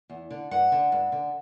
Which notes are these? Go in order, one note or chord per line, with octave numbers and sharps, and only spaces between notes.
E2
D3
G2 F#5
D3
G2
D3